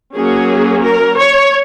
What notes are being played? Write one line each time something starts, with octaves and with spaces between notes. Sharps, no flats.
F#3 A#3 C#4 G#4
A#4
C#5